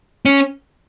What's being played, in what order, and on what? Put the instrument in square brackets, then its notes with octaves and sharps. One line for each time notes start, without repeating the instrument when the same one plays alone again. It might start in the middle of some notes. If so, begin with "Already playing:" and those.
[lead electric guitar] C#4